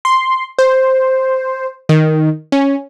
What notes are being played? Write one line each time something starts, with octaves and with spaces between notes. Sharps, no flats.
C6
C5
D#3
C#4